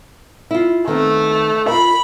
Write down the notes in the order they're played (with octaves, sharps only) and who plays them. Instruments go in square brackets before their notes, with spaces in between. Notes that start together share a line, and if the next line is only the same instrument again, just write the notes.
[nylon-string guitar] E4 F4
[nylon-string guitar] D#3 B3 C4 [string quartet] A3
[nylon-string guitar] F4 A#4 [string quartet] B5